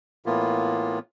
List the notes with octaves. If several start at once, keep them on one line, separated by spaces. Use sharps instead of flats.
A2 E3 A#3 B3 F4